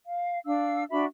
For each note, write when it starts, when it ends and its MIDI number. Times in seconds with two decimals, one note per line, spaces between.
0.06 0.39 77
0.46 0.83 62
0.46 0.83 77
0.46 0.83 88
0.90 1.05 62
0.90 1.05 66
0.90 1.05 76
0.90 1.05 83